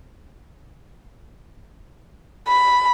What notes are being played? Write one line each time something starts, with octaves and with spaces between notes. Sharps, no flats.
B5